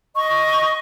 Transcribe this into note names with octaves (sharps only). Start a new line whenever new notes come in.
D#5 C#6